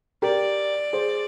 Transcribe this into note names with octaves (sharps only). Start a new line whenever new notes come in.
G4 A#4 D5
G#4 C5